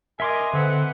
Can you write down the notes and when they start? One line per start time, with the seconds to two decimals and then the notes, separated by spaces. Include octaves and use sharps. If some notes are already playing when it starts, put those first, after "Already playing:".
0.20 A#4 D#5 E5 G#5 C6 D6
0.54 D3 C4 B4 F#5